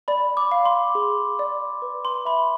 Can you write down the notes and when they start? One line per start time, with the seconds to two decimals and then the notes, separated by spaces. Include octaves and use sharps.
0.08 D5 B5
0.37 D6
0.51 F5
0.65 C6
0.95 G#4
1.39 D5
1.82 B4
2.05 C6
2.25 E5 B5